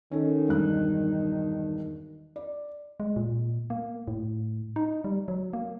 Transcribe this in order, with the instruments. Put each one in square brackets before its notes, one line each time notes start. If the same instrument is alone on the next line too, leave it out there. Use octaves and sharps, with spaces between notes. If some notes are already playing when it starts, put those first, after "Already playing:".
[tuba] D#3 [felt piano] C#4 A4
[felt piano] E1 G2 F#6
D5
[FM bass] G#3
A#2
A#3
A2
D#4
G3
F#3
A#3